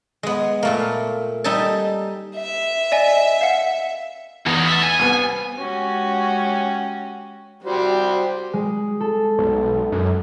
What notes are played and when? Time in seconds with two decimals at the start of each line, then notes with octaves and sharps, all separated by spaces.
0.23 G#3 B3
0.63 A#2 A3 A#3
1.44 G3 D#4 A4 G#5 A5
2.36 E5
2.92 D5 D#5 G#5
3.41 F5 F#5
4.46 E2 E3 D#4
4.68 E5 A5
4.83 G#5
4.99 C2 B3
5.57 G#3 C#4 F#4 G4
7.64 G3 F#4 G4 C5
8.53 G#3
9.00 A4
9.39 B1
9.92 F#2